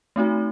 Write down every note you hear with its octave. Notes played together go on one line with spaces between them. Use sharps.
A3 C4 D#4 F#4